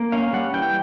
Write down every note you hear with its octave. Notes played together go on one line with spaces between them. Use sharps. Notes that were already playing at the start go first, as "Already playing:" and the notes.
Already playing: A#3
C#4 F5
G3 F#5
E3 G5